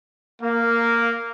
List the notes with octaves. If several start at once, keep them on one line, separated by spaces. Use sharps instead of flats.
A#3